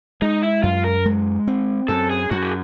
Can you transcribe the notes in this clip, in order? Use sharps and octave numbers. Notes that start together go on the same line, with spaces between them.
G#3 D#4
E4
F#2 F4
A#4
G#3
C4
F#2 A4
G#4
F#2 F#4
G#4